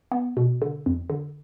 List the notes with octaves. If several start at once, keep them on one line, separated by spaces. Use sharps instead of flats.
B3
B2
D3
F2
D3